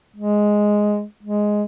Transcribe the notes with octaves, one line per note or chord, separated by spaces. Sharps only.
G#3
G#3